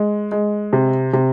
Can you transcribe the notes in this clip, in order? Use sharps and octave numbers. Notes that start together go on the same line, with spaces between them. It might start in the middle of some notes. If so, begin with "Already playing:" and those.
Already playing: G#3
G#3
C3
C3